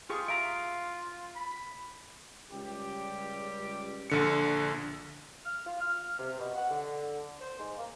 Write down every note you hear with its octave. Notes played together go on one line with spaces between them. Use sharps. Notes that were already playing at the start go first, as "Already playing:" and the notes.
F4 G4 G#4 C#6
E5 F5 A#5 D7
B5
C#2 G3 G4
A#1 D3 C#7
F6
F4
F6
C3
B2
F#5
D3
C5
G#2
A#3